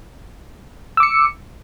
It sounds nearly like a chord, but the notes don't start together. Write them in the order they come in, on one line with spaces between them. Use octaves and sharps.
E6 D6 C#7